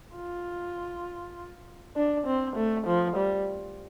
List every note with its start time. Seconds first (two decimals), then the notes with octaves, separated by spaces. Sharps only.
0.16 F4
1.96 D4
2.26 C4
2.56 A3
2.87 F3
3.16 G3